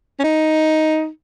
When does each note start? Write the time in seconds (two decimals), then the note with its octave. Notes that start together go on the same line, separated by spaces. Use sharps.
0.20 C#4
0.24 D#4